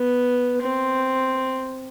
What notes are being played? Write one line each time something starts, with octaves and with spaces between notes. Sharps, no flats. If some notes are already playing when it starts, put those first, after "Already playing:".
Already playing: B3
C4